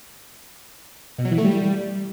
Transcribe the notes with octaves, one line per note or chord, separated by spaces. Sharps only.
B2
F#3
E3
A3
G3